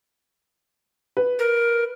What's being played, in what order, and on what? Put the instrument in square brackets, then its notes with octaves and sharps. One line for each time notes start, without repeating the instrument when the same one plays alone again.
[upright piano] B4
[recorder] A#4